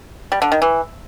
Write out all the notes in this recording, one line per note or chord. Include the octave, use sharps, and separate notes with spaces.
G3
D3
D#3
E3